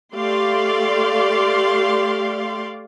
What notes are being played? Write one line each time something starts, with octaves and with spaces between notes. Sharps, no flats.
A3 G4 D5 F5 C6